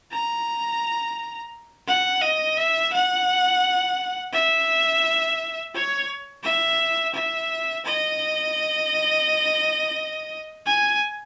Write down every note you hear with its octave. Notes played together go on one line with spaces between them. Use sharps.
A#5
F#5
D#5
E5
F#5
E5
C#5
E5
E5
D#5
G#5